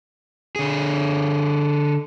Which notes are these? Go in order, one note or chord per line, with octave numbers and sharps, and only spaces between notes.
D3 G#4